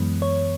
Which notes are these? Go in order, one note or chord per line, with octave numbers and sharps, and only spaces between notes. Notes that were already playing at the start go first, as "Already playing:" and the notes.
Already playing: F#2 E3 G#3 B3
C#5